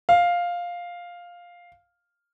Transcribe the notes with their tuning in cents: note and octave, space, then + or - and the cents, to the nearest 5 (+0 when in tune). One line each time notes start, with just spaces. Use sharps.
F5 +5